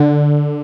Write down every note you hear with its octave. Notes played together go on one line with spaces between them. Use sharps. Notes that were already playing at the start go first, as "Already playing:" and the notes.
Already playing: D3